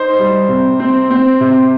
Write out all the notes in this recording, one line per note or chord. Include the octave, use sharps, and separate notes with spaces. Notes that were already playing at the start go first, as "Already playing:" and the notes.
Already playing: D#4 C5
G3
C3
C4
C4
C3